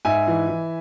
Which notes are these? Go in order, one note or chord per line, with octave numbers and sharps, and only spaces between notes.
G#2 E5 G#5
E3
E3